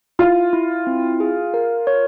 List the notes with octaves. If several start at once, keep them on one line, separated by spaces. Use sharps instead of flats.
E4 F4
E4
C4
G#4
A#4
C#5